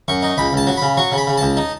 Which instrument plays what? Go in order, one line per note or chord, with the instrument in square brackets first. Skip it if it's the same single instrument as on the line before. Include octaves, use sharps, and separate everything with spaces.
[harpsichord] F#2 C#6
D#4
C#2 B5
C#2 A5
F#3
C#3 B5
F#3 C#6
C#3
B5
C#3
C#2 A5
D#4